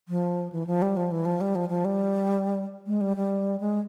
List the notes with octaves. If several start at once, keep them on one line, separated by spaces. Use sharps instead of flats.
F3
E3
F3
G3
F3
E3
F3
G3
F3
F3
G3
G#3
G3
G3
G#3